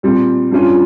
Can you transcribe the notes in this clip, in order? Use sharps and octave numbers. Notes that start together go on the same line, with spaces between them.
A#2 G3 C4
G2 G3 C#4 F4